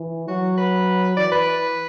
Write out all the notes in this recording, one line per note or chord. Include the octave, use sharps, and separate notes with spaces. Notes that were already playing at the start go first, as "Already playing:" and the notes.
Already playing: E3
F#3 F#4
B4
E3 D5
B4